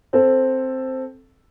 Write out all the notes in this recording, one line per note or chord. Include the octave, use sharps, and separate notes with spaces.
C4 A4 C5